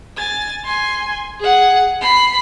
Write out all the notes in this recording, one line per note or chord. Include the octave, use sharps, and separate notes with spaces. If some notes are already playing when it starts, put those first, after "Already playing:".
G#5 A6
G#5 C6
G#4 F#5
B5 C7